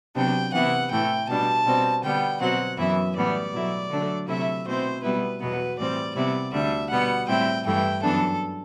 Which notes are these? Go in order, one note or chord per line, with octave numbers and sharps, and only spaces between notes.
C3 F#3 B3 D4 G5
C3 E3 B3 E4 F#5
A2 E3 A3 G5
B2 G3 D4 A5
B2 G3 C4
D3 G3 B3 G5
B2 F#3 C4 F#5
F#2 E3 B3 E4 E5
A2 E3 G3 B3 D5
B2 F#3 A3 E4
D3 F#3 A3 D4
C3 F#3 A3 E4 E5
B2 A3 C4 E4 C5
B2 G3 B3 E4 B4
E2 B2 F#3 B3 B4
A2 E3 G3 C4 D5
C3 G3 B3 E4 D5
D2 D3 G3 D4 E5
B2 G3 B3 F#5
A2 G3 C4 E4 G5
G2 E3 A3 E4 G5
F#2 E3 B3 D4 A4